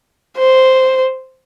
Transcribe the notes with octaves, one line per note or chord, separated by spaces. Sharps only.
C5